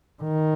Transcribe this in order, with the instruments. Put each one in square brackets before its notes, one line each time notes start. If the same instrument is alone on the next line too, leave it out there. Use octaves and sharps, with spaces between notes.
[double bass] D#3